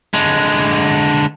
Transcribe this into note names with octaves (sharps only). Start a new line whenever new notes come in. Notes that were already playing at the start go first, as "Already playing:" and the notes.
D3 G#3